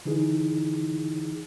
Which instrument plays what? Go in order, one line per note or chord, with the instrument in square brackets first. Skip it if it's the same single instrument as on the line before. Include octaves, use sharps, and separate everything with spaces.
[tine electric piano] D3 E3 D#4 E4 G#4